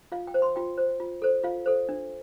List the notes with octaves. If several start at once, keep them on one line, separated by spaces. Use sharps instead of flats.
F4 F5
G5
C5
C6
F4 G5
C5
F4
A4 C5
F4 F5
A4 C5
D4